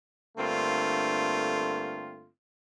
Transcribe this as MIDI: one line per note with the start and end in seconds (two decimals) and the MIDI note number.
0.37 2.28 43
0.37 2.28 50
0.37 2.28 57
0.37 2.28 58
0.37 2.28 60
0.37 2.28 65